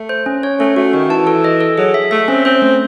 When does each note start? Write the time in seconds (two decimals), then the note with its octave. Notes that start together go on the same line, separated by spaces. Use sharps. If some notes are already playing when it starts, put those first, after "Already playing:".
Already playing: A3
0.09 C5
0.26 C#4
0.43 C#5
0.60 A3 C#4
0.76 A3 F#4
0.93 D#3 F#4
1.10 E3 A5
1.27 A4
1.44 D#5
1.61 A4
1.78 F#3 G#4
1.94 E5
2.11 A3 E5
2.28 C4 C#4
2.45 C4 C5
2.62 A3